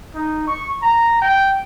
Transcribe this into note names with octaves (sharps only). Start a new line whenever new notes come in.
D#4
C#6
A#5
G5